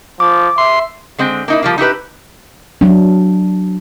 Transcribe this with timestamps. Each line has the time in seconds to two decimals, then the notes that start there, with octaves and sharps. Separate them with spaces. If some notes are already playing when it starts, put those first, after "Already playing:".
0.20 F3 D6
0.58 E5 C6
1.18 D3 G#3 C4
1.48 A#3 D#4 E4
1.63 F3 G3 A#3
1.78 D#4 E4 G4 B4
2.81 F#3 D4